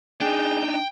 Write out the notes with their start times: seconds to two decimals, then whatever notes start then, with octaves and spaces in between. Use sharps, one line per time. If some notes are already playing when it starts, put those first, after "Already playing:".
0.21 D4 D#4 G#4 G5